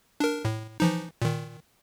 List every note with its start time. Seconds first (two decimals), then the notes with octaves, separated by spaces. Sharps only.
0.20 D4 A#4
0.45 A2
0.80 E3 F3 D#4
1.22 A#2 D#3